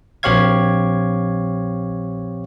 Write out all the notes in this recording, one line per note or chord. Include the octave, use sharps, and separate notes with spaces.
A#1 C4 G4 C#5 F5 G#6